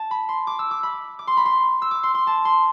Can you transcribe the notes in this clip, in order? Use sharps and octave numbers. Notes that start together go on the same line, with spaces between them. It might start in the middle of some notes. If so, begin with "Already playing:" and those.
Already playing: A5
B5
C6
D6
E6
D6
B5
D6
C6
B5
C6
E6
D6
C6
C6
A5
C6